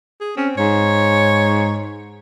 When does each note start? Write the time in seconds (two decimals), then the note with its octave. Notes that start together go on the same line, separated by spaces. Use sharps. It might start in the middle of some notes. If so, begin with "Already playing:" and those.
0.21 G#4
0.37 C4 C#4
0.58 G#2 C#5